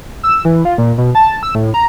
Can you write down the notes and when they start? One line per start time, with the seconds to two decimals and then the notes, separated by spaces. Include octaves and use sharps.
0.23 E6
0.45 E3
0.65 F4
0.78 A#2
0.98 B2
1.15 A5
1.43 E6
1.55 A2
1.74 A#5